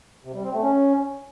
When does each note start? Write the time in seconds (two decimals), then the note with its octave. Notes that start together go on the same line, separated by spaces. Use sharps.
0.24 C3
0.34 G3
0.44 C4
0.53 A3
0.63 C#4